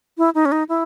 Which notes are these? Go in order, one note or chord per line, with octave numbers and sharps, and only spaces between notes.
E4
D#4
C#4
D#4
E4